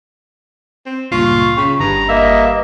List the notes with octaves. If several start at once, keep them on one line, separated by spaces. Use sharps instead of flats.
C4
C#2 G2 A#2 F4 C#6
C#3 G5 B5 B6
G1 G2 D3 A#5 D#6
A#3 D#5 E5